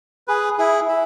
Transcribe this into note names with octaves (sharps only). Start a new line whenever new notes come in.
G#4 B4
E4 G#4
E4